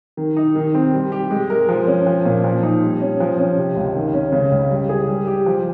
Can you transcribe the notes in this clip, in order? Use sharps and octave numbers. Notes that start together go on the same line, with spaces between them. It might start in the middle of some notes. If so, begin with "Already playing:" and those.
D#3
D#4
D#3
C4
G3
G4
G#3
A#4
F3
C#4
F3
A#2
F3
D#4
G3
C#4
F3
C#4
C3
C#2
D#3
C#4
C#3
C#2
G3
G#4
G3
G4
F3